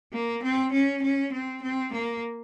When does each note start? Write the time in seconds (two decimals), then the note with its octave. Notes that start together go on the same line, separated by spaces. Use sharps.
0.13 A#3
0.43 C4
0.72 C#4
1.03 C#4
1.33 C4
1.62 C4
1.93 A#3